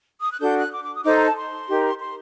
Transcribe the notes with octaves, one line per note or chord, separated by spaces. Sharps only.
D#6
F#6
D4 F#4 A4 G6
F#6
D6
D6
D#6
D#4 A4 C5 D6
A#5
A5
C6
D#4 G4 A#4
C6